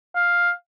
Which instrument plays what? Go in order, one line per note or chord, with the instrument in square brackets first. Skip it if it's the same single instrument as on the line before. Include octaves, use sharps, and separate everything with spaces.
[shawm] F5